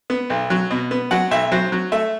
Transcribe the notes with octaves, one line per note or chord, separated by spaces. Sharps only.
B3
B1
F#3
B2
B3
F#3 F#5
B1 E5
F#3 C5
F#3
A3 E5